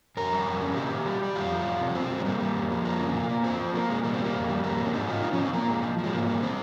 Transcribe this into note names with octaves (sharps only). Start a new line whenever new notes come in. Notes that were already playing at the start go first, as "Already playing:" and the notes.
F2 A#4
G3
F2
C#3
A#2 G4
A#2
G3
G3
F2 F4
G3
F2
C3
G2 C4
G2
G#3
G3 A#3
G3
F2
F3
F2 A#3
C#3
A#2
A#2
F3 C4
F3
A#2 A#3
A#2 G#3
G3 A#3
G3 C4
A#3
F2
G3
F2 A#3
C3
C#4
G#2 D#4
G#2 F4
F3 D#4
C#4
F3
C4
A#2 A#3
A#2 G#3
F3
F3
G#3
G#2 A#3
G3
C4